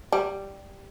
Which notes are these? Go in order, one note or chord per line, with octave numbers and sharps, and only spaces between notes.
G3